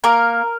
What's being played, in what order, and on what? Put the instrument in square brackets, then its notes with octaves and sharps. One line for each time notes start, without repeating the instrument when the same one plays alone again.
[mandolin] A#3 A#4